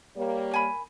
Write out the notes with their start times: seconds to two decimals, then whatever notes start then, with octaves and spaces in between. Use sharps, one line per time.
0.17 G3 A#3 C#5
0.51 A#4 G#5 B5